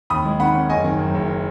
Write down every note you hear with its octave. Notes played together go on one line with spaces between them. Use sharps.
D#2 B5 D#6
G#3
D#3 F#5 B5
C#4
F#1 D#5 G#5
D#3
F#2
F#1